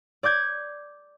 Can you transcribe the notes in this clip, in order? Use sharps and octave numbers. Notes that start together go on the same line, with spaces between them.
D5 D6 G6 G#6